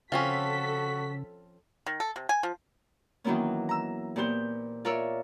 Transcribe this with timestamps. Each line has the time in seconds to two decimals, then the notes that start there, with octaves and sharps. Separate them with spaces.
0.12 C#3 F3 C4 C#4 F#4 A4 B6
1.86 D#3
2.00 A4
2.16 C3
2.29 G#5
2.43 F3
3.24 D#3 E3 F#3 A#3 B3 C#4
3.69 A#5 E6
4.16 A#2 B3 G4 C5 G6
4.85 F4 A#4 C#5 D5 E5